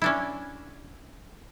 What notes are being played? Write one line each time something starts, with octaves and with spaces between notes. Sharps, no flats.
C#4 D4 E4